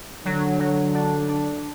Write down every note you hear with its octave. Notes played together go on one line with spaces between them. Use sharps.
D3 F#3
F#3
D4
D4